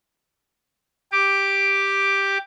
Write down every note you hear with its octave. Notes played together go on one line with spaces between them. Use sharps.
G4 D6